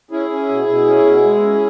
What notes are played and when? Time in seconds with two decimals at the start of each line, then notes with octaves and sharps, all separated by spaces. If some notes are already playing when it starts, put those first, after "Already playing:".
0.11 C#4 E4 G#4
0.30 C#4
0.49 B2
0.68 B2
0.86 C#4
1.05 B2
1.24 G#3
1.43 C#4